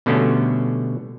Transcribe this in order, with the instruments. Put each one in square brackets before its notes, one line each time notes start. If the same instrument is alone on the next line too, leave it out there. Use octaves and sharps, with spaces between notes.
[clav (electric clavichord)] B2 D3 G3 A3 B3 C#4